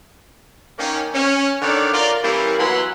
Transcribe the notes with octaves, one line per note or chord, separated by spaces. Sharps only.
D#3 A#3 C#4
C#4
D3 D#3 C#5 D5
F4 A#4 D5
E3 G3 A#3 C#4 E4
E3 F#3 B3 F#5 B5 C6